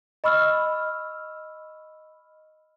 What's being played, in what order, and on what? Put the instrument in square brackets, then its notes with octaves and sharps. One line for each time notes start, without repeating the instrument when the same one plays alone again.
[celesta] D#5 B5 C#6 E6 F6